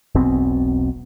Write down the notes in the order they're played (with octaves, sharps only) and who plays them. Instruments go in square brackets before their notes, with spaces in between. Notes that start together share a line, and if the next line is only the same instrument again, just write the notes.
[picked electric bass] E1 B1 B2 C4